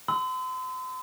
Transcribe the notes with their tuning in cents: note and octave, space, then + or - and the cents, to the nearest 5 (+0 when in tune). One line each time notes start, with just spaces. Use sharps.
C6 -40 E6 -30